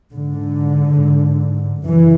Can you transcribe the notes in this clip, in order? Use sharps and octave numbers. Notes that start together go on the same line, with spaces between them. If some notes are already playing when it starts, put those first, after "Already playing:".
G#2 D3
F#2 C#3 E3